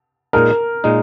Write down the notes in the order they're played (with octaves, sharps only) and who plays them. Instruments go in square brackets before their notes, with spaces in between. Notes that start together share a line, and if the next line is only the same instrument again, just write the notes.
[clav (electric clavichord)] A#2 G#3 D#4 [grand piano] A#4
[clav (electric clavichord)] A#2 G#3 D#4